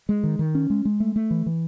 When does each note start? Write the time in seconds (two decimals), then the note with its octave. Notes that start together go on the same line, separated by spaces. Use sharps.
0.09 G#3
0.23 D#3
0.39 D#3
0.55 C#4
0.70 G#3
0.85 G#3
1.00 A3
1.16 A3
1.31 E3
1.46 E3